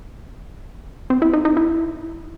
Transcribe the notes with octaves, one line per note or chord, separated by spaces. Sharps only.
C4
E4
D#4
D#4
E4